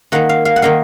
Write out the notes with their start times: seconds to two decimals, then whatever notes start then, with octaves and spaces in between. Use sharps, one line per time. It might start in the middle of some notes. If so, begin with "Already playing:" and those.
0.12 D#3 A#3 D#4 F#5
0.29 F5
0.45 F5
0.56 F#5
0.62 D#3 A#3 D#4 F5